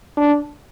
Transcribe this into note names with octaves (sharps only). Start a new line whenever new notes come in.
D4